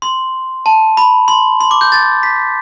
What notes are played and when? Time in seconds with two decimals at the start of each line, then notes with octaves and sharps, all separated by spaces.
0.02 C6
0.66 A5
0.97 B5
1.28 C6
1.61 C6
1.71 D6
1.81 G6
1.92 A6
2.23 B6